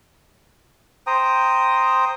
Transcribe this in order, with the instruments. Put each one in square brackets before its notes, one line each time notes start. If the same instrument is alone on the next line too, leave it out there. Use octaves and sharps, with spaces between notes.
[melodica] C5 G5 A#5 D#6